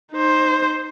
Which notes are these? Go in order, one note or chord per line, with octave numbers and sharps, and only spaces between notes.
D#4 C5